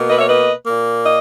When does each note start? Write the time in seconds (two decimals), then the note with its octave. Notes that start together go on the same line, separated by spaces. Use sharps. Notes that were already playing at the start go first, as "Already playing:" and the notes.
Already playing: B2 A#3
0.09 B4 D#5
0.18 C#5 E5
0.28 B4 D#5
0.67 A#2 A#3
1.05 D#5